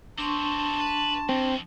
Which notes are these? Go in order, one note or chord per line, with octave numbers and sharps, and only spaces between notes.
B2 C4 D4 A5 C6 C#6
B4
F2 C4